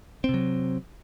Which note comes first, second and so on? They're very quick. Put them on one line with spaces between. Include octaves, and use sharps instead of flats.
C4 C3 F#3